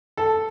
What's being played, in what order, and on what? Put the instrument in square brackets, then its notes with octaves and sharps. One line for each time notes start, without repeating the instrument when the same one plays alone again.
[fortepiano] A4